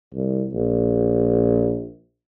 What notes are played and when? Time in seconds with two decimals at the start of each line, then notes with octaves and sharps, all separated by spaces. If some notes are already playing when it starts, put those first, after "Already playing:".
0.14 C2
0.53 A#1